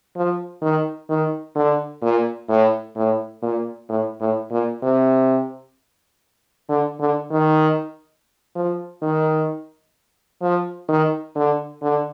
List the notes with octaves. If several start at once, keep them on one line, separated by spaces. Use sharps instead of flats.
F3
D#3
D#3
D3
A#2
A2
A2
A#2
A2
A2
A#2
C3
D3
D3
D#3
F3
D#3
F3
D#3
D3
D3